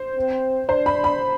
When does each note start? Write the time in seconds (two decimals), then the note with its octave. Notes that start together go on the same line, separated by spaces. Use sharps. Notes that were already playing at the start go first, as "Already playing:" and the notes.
Already playing: C5
0.16 C4
0.69 D4 C5
0.86 B5
1.04 B5